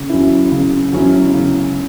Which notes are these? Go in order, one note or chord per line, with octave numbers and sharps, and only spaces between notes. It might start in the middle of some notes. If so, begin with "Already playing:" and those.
Already playing: C#3
F#3 C#4 E4
C#3
F#3 C#4 E4
C#3